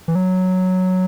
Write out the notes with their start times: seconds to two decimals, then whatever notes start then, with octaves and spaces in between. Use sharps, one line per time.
0.08 E3
0.15 F#3